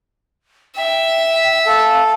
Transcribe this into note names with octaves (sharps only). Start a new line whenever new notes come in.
E5 G5
A4 F5